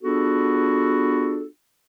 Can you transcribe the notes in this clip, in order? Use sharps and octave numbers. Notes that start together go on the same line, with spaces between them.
B3 D4 F4 F#4 G#4 A4